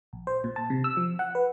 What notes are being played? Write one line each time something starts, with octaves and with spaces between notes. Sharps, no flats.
A#1
C5
A#2
A5
C3
E6
F3
F#5
B4